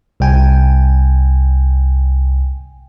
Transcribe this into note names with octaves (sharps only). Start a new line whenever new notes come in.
C2 G5 G#5